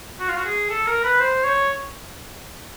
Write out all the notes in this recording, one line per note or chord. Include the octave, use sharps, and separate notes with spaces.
F#4
F4
F#4
G#4
A4
A#4
B4
C5
C#5